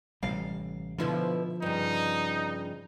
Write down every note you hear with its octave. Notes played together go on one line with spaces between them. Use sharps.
A1 C3 G3 F5
B2 D3 F3 E4 B4
G2 C#3 D#4